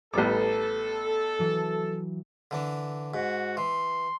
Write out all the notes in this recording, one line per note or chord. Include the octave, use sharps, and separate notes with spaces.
A1 G3 B3 A4 D6
E3 F#3
D3 E3 D4
G#2 F#4
E3 C6